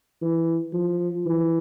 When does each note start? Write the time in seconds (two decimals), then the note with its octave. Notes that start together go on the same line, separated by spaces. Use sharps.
0.22 E3
0.73 F3
1.26 E3